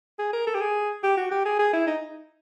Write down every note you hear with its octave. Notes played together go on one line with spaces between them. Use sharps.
G#4
A#4
A4
G4
G#4
G4
F#4
G4
G#4
G#4
E4
D#4